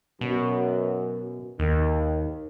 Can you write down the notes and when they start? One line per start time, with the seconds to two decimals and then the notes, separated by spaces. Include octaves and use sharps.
0.21 F#2 B2
1.59 D#2 D#3